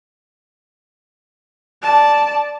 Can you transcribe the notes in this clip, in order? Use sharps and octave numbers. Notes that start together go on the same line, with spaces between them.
D5 A5